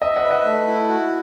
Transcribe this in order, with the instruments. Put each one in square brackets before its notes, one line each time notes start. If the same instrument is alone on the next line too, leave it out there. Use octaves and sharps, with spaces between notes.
[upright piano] D#5 [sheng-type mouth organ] E5
[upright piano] D#5 F#5
[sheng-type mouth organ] B4
[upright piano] D#5 F#5
[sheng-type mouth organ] A3
E4
F#4